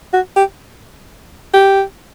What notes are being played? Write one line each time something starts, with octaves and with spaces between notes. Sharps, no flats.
F#4
G4
G4